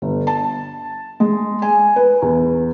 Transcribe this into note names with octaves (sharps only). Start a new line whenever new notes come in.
G1
A5
G#3
G#5
B4
E2